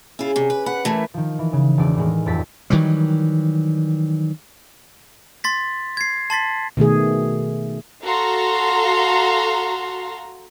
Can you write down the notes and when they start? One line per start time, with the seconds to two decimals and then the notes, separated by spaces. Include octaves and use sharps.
0.19 C#3 E4 F4
0.36 C3 D6
0.50 B4
0.66 B4 F#5
0.85 E3 A3 E4 A#4 B4
1.14 D#3 F3
1.39 E3
1.53 C#3
1.77 E1 D5
1.97 A2 D#3 G#3
2.26 D#1 F2 D6 A6 B6
2.70 D#3 E3 F#3 G3
5.44 C6 A6 B6
5.97 G#6 C7
6.30 A5 C6 A6 B6
6.77 B2 D#3 A3 G#4
8.03 F#4 A4 F5 A#5 C6